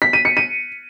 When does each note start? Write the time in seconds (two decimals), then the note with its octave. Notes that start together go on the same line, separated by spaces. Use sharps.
0.02 B6
0.13 D#7
0.25 C#7
0.37 D#7